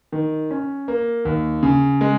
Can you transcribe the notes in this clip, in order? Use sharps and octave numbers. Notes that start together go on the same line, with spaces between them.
D#3
C#4
A#3
D#2
C#3
G#3